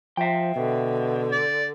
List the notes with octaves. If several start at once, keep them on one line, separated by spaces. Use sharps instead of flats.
F3 E5 G5
B2 D3
D5